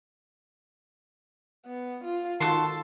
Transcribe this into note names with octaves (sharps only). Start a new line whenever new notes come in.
B3
F4
D#3 F4 F#4 A4 A5 C6